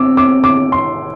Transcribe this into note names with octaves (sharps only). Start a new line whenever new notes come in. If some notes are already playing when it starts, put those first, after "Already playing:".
Already playing: C4 D6 E6
D6
D6
C6